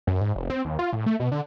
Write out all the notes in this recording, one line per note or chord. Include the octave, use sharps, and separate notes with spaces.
F#2
G#2
F1
C4
D#2
F4
A2
A3
B2
D3